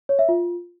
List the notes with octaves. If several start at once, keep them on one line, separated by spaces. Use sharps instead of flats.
C#5
E5
F4